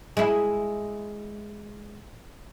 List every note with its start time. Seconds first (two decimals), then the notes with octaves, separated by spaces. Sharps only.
0.17 G#3 E4